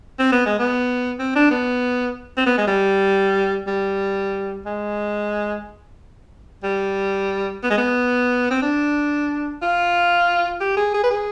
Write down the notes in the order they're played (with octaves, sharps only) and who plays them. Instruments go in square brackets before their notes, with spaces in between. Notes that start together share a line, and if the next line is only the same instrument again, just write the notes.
[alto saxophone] C4
B3
G#3
B3
C4
D4
B3
C4
B3
G#3
G3
G3
G#3
G3
B3
G#3
B3
C4
D4
F4
G4
G#4
G#4
B4
G#4